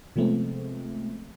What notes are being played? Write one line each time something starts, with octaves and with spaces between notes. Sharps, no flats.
C3 F3 G#3 A3 B3 C4